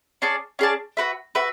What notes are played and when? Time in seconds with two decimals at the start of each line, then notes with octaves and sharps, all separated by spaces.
0.22 C#4 G#4 D5 A5
0.59 C#4 G#4 D5 A5
0.97 F#4 B4 E5
1.35 F#4 B4 E5